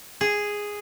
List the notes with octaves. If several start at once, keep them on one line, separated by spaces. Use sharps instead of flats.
G#4